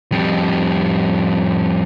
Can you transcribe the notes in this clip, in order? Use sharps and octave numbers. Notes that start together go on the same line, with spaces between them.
F2 G3